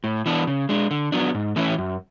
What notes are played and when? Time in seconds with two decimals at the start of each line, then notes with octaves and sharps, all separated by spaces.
0.04 A2
0.26 E3 B3 D4
0.47 C#3
0.69 G#3 D4
0.91 D3
1.12 F#3 B3 D4
1.34 G#2
1.56 E3 A3 C#4 E4
1.78 F#2